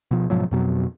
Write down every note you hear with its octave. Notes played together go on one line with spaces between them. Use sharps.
B2 F3
G#2 B2 F3 F#3
F2 B2 F#3